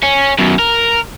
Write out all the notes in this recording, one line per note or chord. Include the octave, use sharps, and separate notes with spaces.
C#4
F#2 B2
A#4